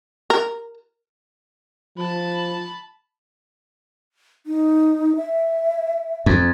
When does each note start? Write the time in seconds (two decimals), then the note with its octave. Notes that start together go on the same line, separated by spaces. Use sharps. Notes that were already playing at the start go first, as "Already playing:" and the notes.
0.30 A#4
1.98 F3 A5 B5
4.46 D#4
5.16 E5
6.26 F2